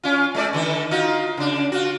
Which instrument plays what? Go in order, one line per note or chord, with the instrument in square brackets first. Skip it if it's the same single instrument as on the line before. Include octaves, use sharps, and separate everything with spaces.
[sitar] C#4 F4
G#3 A3 D5
D3 D#3 A4
D#4 F4 F#4
C#3 D4
F4 F#4